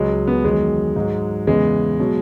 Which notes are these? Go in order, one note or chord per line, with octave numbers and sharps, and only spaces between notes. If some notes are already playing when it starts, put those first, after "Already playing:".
Already playing: C#2 C#3 F#3 G#3
B3
E2 D#3 F#3 G#3
G#2 F#3
E2 C#3 E3 G#3
B2 F#3